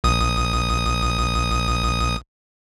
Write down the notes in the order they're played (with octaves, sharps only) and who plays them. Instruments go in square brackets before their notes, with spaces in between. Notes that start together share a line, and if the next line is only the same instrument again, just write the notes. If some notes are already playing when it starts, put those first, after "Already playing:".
[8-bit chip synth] A#1 D#6